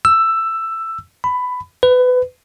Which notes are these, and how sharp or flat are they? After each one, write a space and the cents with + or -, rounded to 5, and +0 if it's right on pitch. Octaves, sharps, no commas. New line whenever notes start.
E6 +10
B5 +15
B4 +25